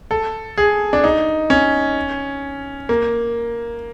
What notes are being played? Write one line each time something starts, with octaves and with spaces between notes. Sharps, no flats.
A4
G#4
D4
D#4
C#4
A#3